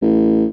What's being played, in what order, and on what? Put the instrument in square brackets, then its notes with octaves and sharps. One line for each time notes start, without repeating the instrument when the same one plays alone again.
[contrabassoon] A1